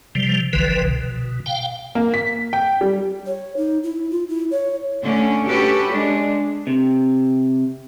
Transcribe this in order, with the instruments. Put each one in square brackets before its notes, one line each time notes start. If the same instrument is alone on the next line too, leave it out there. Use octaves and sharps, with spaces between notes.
[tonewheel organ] C3 F3 G3
G1 C2 D3 E3 F3 B4
B2
F5 G5
[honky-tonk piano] A#3
B6
G5
G3
[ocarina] C#5
D#4
E4
F4
E4
C#5
[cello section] D3 A3 C#4
C#4 F#4 G4 A4 B4
G#3 D4
[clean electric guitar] C3